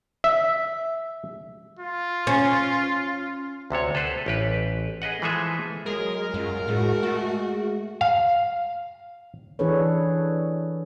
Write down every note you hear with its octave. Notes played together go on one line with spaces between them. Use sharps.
E5
F4
C#4
D2 C3 A4 C#5
A4 B4 C5 F#5
A1 G4 B4
G#4 B4 D#5 F#5
E3 F3 G#3 G#4 A4 E5
F#3 G#3 G#4 A#4
F#2 G#3 F4
A2 G#3 F#4
A3
F5
E3 D4 G#4 A4 B4 C#5